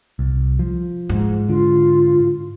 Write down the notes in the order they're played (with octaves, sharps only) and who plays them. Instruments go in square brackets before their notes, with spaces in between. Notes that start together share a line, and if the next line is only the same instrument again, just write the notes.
[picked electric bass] C2
F3
[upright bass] G#2
[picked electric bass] D3 [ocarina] F4